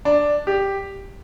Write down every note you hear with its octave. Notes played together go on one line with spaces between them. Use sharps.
D4
G4